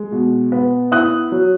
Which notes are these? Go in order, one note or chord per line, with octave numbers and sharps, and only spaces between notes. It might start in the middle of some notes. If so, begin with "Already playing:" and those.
Already playing: G#3
B2
B3
E4 D#6 F#6
F#3